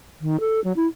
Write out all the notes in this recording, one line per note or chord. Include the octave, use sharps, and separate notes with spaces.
D#3
A4
F#3
E4